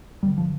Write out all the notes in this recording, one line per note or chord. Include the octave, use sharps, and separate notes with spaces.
G2 D3 G3
F3